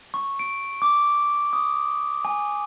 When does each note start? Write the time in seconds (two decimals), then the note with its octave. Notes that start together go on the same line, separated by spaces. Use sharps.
0.14 C#6
0.39 D7
0.82 D6
1.53 D#6
2.25 G#5